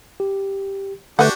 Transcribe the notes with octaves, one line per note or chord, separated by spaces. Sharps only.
G4
D3 A3 D4 F#4 G4 B4 F#5